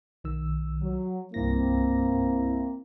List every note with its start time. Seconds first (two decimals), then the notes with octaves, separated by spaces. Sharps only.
0.24 B1 D#3 E6
0.82 F#3
1.34 C2 G2 A#3 C4 E4 A#6